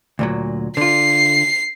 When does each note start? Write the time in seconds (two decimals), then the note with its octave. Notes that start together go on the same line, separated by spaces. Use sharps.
0.19 D2 A#2 F#3
0.77 D3 F4 C7